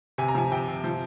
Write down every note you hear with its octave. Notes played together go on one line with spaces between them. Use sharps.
C3 G#5
A#5
F3 G#5
C3 G5
C3
F3